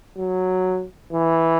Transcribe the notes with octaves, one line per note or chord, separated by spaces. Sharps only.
F#3
E3